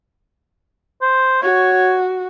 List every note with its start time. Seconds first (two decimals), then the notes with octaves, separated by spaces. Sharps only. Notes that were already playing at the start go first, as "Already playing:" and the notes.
1.02 C5
1.43 F#4 C#5